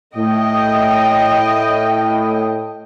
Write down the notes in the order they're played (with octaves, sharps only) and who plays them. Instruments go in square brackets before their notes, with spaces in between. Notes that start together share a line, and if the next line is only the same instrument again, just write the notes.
[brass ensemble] A2 [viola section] D#5 G5